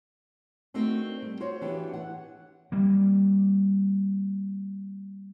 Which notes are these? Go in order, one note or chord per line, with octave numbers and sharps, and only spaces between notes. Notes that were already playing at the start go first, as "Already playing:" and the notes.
A3 C4 D4 D#4 F#4 A#4
G3
F4 F#4 C5 C#5
E3 B3 D4 F#4 G4
F#5
G3 A#3